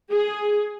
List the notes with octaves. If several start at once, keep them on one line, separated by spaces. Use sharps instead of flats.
G#4